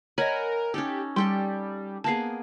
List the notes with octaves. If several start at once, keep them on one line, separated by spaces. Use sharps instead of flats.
A#4 C#5 D#5 F#5 G#5 B5
C#4 D#4 G4 A4
G3 G4 A4 G5 C6
A#3 B3 G#4 A5 C7